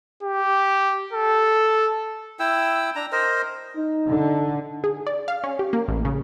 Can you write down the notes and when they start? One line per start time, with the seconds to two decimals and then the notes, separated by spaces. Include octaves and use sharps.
0.23 G4
1.13 A4
2.39 E4 G5 E6
2.96 D4 A#5
3.12 A#4 C5 D#5
3.76 D#4
4.07 D3
4.84 G#4
5.07 D5
5.28 F5
5.44 C#4
5.59 G4
5.73 A#3
5.88 A1
6.05 C#3